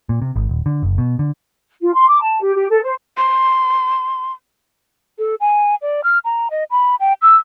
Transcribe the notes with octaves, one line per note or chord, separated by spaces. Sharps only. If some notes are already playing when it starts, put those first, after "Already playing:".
A#2
C3
G#1
D#1
D3
F#1
B2
D3
F4
C6
D6
A5
G4
G4
A4
C5
C6
A4
G#5
D5
F6
A#5
D#5
B5
G5
E6